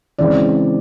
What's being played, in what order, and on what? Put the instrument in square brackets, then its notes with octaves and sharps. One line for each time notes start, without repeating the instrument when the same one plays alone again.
[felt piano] C#3 E3 G#3 C4 D5